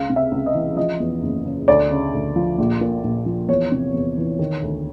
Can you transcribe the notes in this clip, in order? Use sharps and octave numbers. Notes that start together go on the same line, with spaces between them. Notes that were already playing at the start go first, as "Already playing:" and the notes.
Already playing: C#2 F5
C3
E5
C#2
D#5
E3
F3 D#5
E2
F#1
C#3
D2 D5
C#3
D2
F3
A#1
A#2
A#1
F3
E2 C#5
C3
E2
E3
D#3
D2